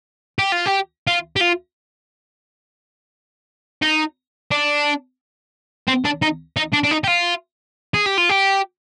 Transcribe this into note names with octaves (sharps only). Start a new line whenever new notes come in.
G4
F4
G4
F4
G4
F4
D#4
D4
C4
D4
D#4
D#4
D4
D4
D#4
G4
F4
G#4
G4
F4
G4